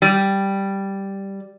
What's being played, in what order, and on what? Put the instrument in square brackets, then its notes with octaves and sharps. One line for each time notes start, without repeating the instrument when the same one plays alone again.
[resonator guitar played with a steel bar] G3